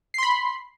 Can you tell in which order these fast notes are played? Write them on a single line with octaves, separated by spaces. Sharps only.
C7 C6 B5